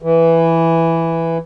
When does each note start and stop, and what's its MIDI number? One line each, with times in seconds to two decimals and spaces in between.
0.02 1.38 52